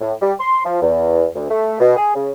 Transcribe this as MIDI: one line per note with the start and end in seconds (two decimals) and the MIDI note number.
0.01 0.13 45
0.22 0.32 55
0.39 0.63 84
0.65 0.79 53
0.81 1.26 40
1.35 1.46 38
1.50 1.75 57
1.80 1.94 47
1.96 2.14 68
2.15 2.31 49